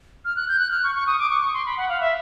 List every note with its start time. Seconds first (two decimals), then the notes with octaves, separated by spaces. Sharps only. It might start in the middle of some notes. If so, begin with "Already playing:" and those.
0.25 F6
0.36 F#6
0.48 G6
0.59 F#6
0.71 F6
0.83 C#6
0.95 C#6
1.07 D#6
1.19 D6
1.30 C#6
1.42 C#6
1.54 C6
1.66 B5
1.77 F#5
1.89 F5
2.00 E5